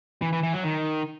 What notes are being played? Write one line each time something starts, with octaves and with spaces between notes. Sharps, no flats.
E3
E3
E3
F#3
D#3